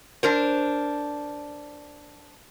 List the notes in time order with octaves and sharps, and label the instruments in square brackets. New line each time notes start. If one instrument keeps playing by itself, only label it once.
[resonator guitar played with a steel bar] D4 A#4 C5